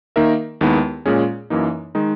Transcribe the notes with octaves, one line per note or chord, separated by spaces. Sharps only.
D#3 A#3 D#4 A#4 E5
D#2 D#3 G#3 B3 E4
A#2 G#3 C#4 G#4
F#2 E3 A#3 D#4
D#3 G#3 D#4